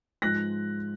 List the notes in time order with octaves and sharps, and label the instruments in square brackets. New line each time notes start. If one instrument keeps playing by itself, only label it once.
[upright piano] G#2 F3 G#3 F#6 A#6